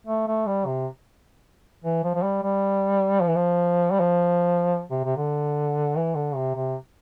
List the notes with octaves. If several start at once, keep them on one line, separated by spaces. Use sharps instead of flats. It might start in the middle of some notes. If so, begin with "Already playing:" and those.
A3
A3
G3
C3
E3
F3
F3
G3
G3
F3
E3
F3
G3
F3
C3
C3
D3
E3
D3
C3
C3